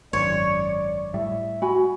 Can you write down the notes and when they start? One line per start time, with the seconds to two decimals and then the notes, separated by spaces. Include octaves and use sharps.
0.13 G#1 F#2 C#5 D5
1.14 A2 G3 E5
1.62 F#4 G#5 B5